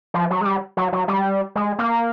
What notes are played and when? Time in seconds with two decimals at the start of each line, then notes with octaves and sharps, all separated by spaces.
0.14 F3
0.30 F#3
0.41 G#3
0.45 G3
0.77 F#3
0.93 F#3
1.08 G3
1.56 G#3
1.79 A#3